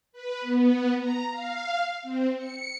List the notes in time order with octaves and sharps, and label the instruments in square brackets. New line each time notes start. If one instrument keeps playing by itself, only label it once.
[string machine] B4
B3
A#5
F5
C4
C#7